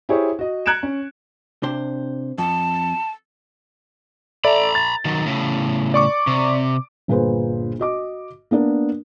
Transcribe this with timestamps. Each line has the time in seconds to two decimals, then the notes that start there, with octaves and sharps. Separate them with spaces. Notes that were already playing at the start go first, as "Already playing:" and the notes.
0.09 E4 G4 G#4 C5 C#5
0.39 F#4 D#5
0.66 A#5 F#6 G#6 C#7 D7 E7
0.83 C#4
1.63 C3 D4 C5
2.38 F2 A5
4.44 A4 D5 E5 A#5 B5
4.75 A6
5.05 D#3 F#3
5.26 A2 C#3
5.94 D5 C#6 D6
6.27 C3
7.08 G1 A#2 G#4 B4 C5
7.79 F#4 D#5 D6
8.51 A#3 B3 D4 A#4